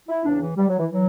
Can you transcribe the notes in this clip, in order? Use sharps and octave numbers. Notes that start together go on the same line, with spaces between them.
E4
E2 C#3 E3 D4
E3
G3
F#3
E3
E3 F#3